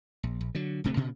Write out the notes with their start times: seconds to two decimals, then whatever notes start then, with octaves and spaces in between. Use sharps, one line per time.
0.23 A#1
0.41 A#1
0.55 D3 F#3
0.84 D1 C3 A3 C4
0.96 G2 A#2 C#3